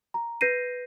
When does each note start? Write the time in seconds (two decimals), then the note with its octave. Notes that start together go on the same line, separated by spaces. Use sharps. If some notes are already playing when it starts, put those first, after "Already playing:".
0.14 A#5
0.41 B4 G6 A#6 C7 D#7